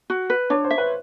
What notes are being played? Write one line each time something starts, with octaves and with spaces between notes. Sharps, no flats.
F#4
B4
D4 C#5
C5
E5
B4